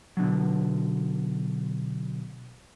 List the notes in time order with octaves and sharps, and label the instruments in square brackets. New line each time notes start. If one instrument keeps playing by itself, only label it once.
[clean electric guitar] B2 D3 F#3